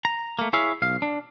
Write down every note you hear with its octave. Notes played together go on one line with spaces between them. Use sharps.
A#5
A3 A#3
E4 G#4 C#5 E5 F5
B1 F5
D4